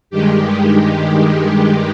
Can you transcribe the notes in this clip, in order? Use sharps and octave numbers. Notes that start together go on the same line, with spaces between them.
G2 D#3 G#3 G4